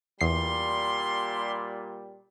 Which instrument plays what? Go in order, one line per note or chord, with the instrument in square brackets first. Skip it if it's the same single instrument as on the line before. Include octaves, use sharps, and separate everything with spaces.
[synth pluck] E2 C7 [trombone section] A#2 G3 [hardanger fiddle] C6